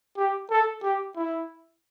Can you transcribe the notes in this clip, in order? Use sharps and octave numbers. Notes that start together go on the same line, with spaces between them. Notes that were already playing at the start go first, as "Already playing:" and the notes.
G4
A4
G4
E4